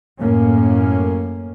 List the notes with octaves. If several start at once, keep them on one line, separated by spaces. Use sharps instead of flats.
F#2 A2 A#3 C#4